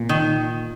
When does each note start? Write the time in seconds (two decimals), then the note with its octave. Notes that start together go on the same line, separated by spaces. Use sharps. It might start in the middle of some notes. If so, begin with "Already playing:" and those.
Already playing: A#2
0.09 D#3